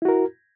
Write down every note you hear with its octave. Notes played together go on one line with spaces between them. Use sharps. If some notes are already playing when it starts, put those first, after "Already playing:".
E4 F#4 A#4